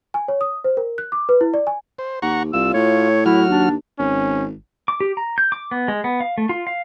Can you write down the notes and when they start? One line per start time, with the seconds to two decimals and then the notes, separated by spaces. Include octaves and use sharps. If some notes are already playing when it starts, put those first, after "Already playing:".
0.14 G#5
0.28 C#5
0.41 D#6
0.64 C5
0.77 A#4
0.98 F#6
1.12 D6
1.29 B4
1.41 E4
1.54 D5
1.67 G#5
1.99 C5
2.22 D#2 F#5 A#5 C#6
2.53 C2 F4 E6
2.74 A2 C#5
3.26 F#3 E4 F#4 F6
3.49 D#2 D4
3.99 G#1 C#4
4.88 D6
5.01 G4
5.17 A#5
5.38 G6
5.52 D6
5.71 B3
5.88 G#3
6.04 B3
6.21 F5
6.38 A3
6.49 F4
6.67 F5